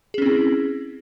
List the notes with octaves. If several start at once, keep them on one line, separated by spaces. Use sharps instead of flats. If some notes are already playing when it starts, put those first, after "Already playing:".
C4 C#4 E4 G#4